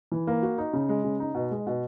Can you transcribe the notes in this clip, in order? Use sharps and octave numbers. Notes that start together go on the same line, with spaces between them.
E3
A#3
F#4
D#4
C#3
G#3
C#3
D#4
B2
G#3
B2